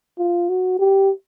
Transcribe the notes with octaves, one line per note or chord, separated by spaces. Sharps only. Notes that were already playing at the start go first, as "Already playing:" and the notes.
F4
F#4
G4